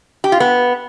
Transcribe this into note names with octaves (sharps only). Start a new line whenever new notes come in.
G4
F4
B3